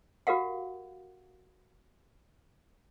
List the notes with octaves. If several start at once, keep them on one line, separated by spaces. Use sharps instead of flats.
F#4 G4 A#4 F5 F#5